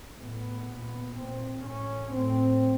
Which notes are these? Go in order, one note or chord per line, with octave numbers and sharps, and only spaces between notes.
A2 B3
A#2
A#2 C4
A2 C#4
A2 C4